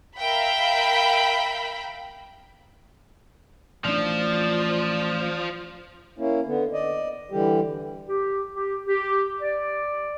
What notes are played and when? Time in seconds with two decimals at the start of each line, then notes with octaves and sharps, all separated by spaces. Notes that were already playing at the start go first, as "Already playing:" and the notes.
0.17 A#4 E5 F5 G5 B5
3.85 A1 F3 D4 D5
6.18 A#3 C#4 E4
6.46 D3 B3
6.73 D5 D#5
7.31 D3 E3 G3 G4
8.08 G4
8.54 G4
8.87 G4
9.41 D5